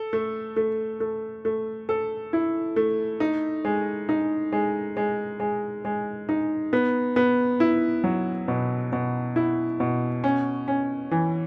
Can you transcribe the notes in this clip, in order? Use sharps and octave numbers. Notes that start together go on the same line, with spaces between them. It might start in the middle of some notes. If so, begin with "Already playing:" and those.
Already playing: A4
A3
A3
A3
A3
A4
E4
A3
D#4
G#3
D#4
G#3
G#3
G#3
G#3
D#4
B3
B3
E4
F#3
B2
B2
E4
B2
C#4
C#4
E3